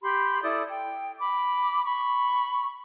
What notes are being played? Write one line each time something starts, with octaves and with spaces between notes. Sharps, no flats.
G4 B5 C6
E4 A4 D5 D#6
G5
B5 D6
B5 C#6